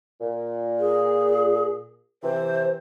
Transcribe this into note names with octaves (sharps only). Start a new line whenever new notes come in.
A#2
G#4
C3 E3 C5